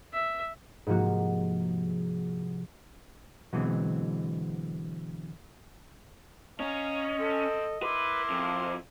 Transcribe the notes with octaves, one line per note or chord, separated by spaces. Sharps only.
E5
G#2 C3 F3 A#3 F#4
B2 D3 E3 F#3 G#3 C4
C#4 C#5 D#5 F5 A#5
C4 A4
E4 A#4 B4 C6 D6
F2